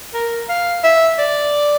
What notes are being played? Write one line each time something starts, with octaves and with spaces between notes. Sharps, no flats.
A#4
F5
E5
D5